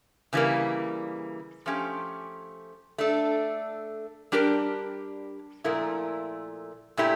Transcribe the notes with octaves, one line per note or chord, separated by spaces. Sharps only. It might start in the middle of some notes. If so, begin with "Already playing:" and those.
C#3 E3 G3 A#3
F3 A3 C#4 G4
A3 D4 A4
G3 D4 G4 A#4
A#2 F3 A3 E4 A#4
A#2 A3 E4 G4